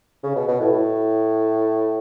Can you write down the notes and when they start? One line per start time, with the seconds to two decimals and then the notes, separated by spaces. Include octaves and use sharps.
0.23 C#3
0.35 B2
0.48 B2
0.60 A2
0.72 A2